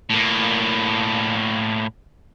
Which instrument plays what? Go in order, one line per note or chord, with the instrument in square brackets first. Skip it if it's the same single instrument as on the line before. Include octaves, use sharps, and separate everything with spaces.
[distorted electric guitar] A2 A#3